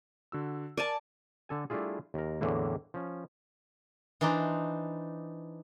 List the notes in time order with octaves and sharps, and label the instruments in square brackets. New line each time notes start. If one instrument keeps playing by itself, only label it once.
[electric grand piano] D3 F#4 E6
[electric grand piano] A#4 [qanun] D5 G#5 A5
[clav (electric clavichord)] D3 A4 G#5
G3 A3 D4 E4 F4 G#4
D#2 A#4
E2 A2 D3 E3 A#3
F3 C#4
[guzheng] E3 D4 D#4 C5 D5